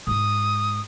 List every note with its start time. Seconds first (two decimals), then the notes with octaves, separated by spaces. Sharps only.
0.07 G#2 G#3 D#6